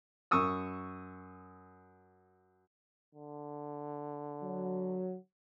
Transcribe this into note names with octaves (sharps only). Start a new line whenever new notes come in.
F#2 C#6 D#6 E6
D3
F#3